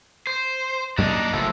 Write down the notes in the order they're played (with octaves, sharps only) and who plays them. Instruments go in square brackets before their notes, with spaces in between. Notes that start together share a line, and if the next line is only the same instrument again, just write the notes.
[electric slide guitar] C5
[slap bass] F#2 G3 A#3 [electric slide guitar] D4 D#4
[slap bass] F#1 [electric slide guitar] A2 F3 A4